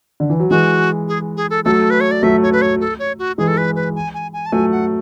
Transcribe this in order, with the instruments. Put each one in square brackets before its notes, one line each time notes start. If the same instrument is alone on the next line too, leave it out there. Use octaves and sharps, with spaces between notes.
[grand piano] D3
E3
F#3
[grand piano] E3 G#3 [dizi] F#4
[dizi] G#4
G#4
A4
[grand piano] F#3 A3 [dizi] A4
[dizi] B4
C#5
D5
[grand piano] F#3 A3 [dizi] E5
[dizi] C#5
B4
C#5
A4
C#5
F#4
[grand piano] E3 G#3 [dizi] G#4
[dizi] A4
B4
B4
G#5
G#5
G#5
A5
[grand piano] F#3 A3 [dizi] G#5
[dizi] F#5